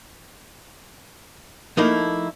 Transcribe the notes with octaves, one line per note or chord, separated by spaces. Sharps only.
F3 A3 A#3 D#4 E4